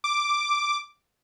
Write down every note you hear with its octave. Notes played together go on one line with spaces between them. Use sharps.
D6